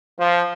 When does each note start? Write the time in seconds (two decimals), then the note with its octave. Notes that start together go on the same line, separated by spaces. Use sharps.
0.20 F3